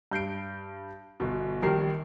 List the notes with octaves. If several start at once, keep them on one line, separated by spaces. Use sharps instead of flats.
G2 G6 C7 D7
G1 B2
A#1 D#3 G3 A#4 C7